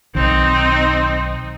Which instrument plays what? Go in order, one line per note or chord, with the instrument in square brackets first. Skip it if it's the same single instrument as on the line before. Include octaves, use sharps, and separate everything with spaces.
[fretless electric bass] B1 D#3 [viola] C4 D#4